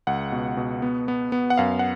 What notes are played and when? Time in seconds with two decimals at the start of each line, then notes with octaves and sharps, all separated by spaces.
0.07 C#2 F#5
0.32 B2
0.57 B2
0.82 B3
1.08 B3
1.32 B3
1.50 F#5
1.58 F#2 F5
1.79 F#5